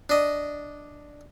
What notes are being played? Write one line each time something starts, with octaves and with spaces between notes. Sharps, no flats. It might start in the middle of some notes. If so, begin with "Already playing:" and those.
D4 D#5